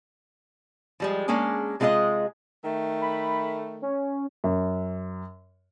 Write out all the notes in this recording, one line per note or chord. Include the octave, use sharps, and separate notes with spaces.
F3 G3 G#3
G#3 A#3 C#4 D4 G#4
C3 G#3 C4 F4 G#4 D#5
D#3 A3
B5
C#4
F#2